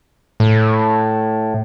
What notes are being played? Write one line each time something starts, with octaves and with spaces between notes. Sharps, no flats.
A2